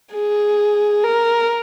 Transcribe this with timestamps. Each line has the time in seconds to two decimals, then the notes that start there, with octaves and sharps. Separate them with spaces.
0.12 G#4
1.04 A#4